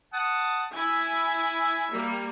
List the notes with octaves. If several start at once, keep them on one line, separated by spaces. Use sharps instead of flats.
F#5 A5 D#6
E4 E5 G#5
G3 A#3